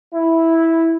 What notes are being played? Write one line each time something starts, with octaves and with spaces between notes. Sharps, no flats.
E4